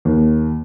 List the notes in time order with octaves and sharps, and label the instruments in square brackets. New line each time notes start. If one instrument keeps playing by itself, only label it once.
[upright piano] D#2